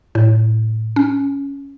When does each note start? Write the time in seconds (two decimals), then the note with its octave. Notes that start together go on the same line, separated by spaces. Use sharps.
0.15 A2
0.96 C#4